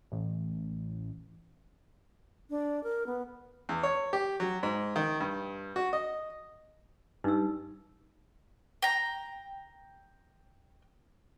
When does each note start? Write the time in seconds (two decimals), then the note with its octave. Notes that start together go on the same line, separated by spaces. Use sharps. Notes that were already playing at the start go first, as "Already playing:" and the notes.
0.12 A1
2.50 D4
2.84 A#4
3.07 B3
3.69 E2
3.83 C#5
4.13 G4
4.40 F#3
4.63 G#2
4.96 D#3
5.20 G2
5.76 F#4
5.93 D#5
7.24 G2 D#4 E6
8.82 G5 A#5